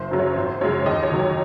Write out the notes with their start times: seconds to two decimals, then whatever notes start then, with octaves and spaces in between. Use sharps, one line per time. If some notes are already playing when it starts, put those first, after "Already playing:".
Already playing: F#1 C5
0.11 F#2 C#3 F#3
0.19 C#5
0.36 G#1 C5
0.61 F#2 C#3 G#3 C#5
0.86 D#2 D#5
1.03 C#5
1.11 D#3 F#3
1.19 C#5